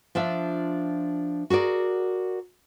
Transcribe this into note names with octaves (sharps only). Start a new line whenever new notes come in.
F3 D4 F4 E5
F#4 G#4 A#4 D5